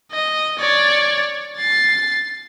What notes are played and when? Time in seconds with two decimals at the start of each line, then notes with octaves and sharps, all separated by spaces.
0.12 D#5
0.59 C#5 D5
1.57 A6 C7